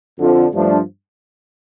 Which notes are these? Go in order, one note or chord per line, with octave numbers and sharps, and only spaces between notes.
F2 D3 F3
G2 F3 A3 D4